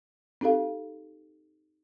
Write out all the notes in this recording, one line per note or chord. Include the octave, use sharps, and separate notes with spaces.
C4 D#4 G4 A4 F5